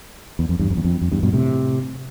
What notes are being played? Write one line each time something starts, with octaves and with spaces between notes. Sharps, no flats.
E2
F2
E2 G2
F2
E2
F2
F2
E2 G2
G2 B2
A2 C3